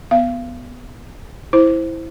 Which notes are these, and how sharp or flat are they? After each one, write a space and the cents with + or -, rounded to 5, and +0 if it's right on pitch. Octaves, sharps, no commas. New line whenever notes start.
B3 +0 F5 -30
E4 -5 C5 +0